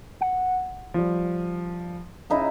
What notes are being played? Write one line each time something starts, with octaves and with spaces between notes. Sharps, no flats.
F#5
F3 G3
C#3 D#4 E4